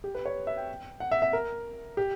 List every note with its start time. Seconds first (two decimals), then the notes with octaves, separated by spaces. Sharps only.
0.04 G4
0.15 B4
0.26 C#5
0.47 E5
0.57 G5
1.00 F#5
1.12 E5
1.22 E5
1.33 A#4
1.97 G4